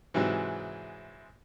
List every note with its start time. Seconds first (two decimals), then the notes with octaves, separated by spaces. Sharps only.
0.14 G#2 C3 E3 F#3 G#3